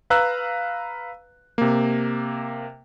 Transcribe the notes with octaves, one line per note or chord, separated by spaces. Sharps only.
B4 F5 A#5 E6 F#6
C3 A#3